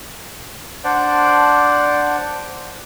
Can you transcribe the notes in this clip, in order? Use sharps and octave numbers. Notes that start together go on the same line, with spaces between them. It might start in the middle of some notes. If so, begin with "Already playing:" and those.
D4 C5 D5 F#5